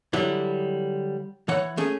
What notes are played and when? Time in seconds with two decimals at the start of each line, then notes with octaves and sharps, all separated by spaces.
0.13 D3 F#3 G3 E4
1.48 E3 C#5 F#5
1.77 A3 C#4 G#4